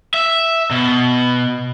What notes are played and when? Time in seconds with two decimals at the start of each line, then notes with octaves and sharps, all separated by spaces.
0.14 E5
0.71 B2